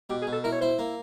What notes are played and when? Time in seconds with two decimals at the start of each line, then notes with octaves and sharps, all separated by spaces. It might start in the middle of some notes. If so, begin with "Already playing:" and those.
0.10 B2 G4
0.22 G#4
0.27 B2
0.32 A4
0.44 E4 A#4
0.52 C#5
0.61 E4 C5
0.79 A#3